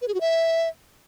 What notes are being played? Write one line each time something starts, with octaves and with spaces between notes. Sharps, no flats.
B4
G#4
F#4
E5